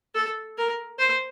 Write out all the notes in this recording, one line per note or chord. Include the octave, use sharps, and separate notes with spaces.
A4
A#4
C5